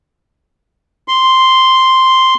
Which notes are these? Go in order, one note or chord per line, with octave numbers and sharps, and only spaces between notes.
C6